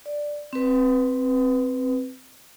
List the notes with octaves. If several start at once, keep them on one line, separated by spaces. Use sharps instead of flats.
D5
C4 B4